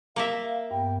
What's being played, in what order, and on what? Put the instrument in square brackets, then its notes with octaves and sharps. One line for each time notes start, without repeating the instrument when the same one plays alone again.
[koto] A#3 A#4 E5 [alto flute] F5
[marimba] G2 B3 [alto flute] G5